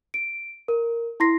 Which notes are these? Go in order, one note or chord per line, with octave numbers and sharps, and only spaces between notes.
D7
A#4
E4 C6 A#6 C7